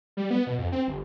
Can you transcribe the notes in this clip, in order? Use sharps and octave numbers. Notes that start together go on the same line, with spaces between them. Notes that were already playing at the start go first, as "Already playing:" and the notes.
G3
B3
B2
F2
C4
G1